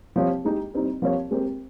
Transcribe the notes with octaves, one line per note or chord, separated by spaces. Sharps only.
F3 C4 G4 C#5
G#3 D#4 G4
G3 C4 D#4
F3 C4 G4 A#4 C#5
G#3 C4 G4 A#4